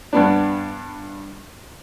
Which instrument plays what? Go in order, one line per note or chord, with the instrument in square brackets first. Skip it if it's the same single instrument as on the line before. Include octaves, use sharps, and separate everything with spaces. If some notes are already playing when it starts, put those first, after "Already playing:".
[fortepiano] G2 B3 D4